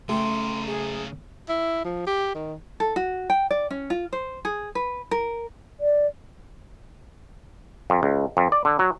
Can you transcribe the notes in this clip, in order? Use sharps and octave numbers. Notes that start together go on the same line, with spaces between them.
C#3 A3 G5 C6
G#4
E4
F3
G4
D#3
A4
F#4
G5
D5
C#4
F4
C5
G#4
B4
A#4
D5
F2
C#2
F2
D5
D3
F#3